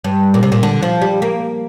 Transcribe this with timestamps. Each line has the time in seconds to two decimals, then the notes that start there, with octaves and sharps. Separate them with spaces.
0.04 G2
0.34 A#2
0.43 C3
0.52 A#2
0.63 D3
0.83 F3
1.01 G3
1.22 A#3